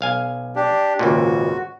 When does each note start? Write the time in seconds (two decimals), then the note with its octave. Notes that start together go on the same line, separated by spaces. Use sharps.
0.01 B1 F5 G#5
0.56 D4 G4
0.99 G#1 C#2 A#2 F#4